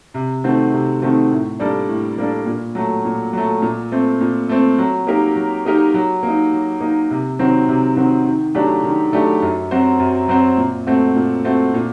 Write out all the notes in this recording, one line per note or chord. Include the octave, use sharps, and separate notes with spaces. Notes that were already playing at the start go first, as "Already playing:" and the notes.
C3
D#3 A3 C4 F#4
C3
D#3 A3 C4 F#4
A2
G3 A#3 D4 A4
A2
G3 A#3 D4 A4
A#2
F#3 A3
A#2
F#3 A3
A#2
A3 C4
A#2
A3 C4
F#3
A#3 D#4 G4 A#4
F#3
A#3 D#4 G4 A#4
F#3
A#3 D#4
F#3
A#3 D#4
C3
D#3 F#3 C4 F#4
C3
D#3 F#3 C4 F#4
D#3
F#3 A3 D4 G4
D#3
F#3 A3 D4 G4
F#2
F#3 C4 F#4 C5
F#2
F#3 C4 F#4 C5
A#2
A3 C4 F#4
A#2
A3 C4 F#4
A#2